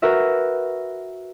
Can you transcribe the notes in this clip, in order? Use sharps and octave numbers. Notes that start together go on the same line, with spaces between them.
F#4 A#4 B4 E5